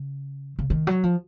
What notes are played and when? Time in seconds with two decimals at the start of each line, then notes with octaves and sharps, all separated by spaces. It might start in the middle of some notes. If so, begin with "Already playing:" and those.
Already playing: C#3
0.59 C#3
0.70 D#3
0.87 F#3
1.04 F3